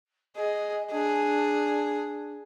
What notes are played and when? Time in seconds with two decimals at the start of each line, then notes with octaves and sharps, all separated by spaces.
0.36 G#4 D#5
0.92 D4 G#4